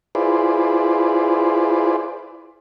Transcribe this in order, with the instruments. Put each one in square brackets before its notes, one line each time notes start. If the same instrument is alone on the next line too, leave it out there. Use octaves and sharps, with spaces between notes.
[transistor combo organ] E4 F4 G#4 B4 C5 D5